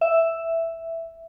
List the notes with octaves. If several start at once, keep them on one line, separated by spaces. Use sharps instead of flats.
E5